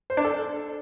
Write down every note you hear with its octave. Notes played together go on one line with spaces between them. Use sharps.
C5
D4
A4